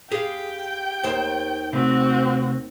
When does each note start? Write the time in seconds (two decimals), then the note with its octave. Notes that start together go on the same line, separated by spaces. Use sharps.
0.12 G4 G#4 F5 G5
1.03 D#2 D#3 C5
1.73 C3 A3 C4 F#4